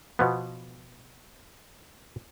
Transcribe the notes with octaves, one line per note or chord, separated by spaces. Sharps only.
B2 F3 B3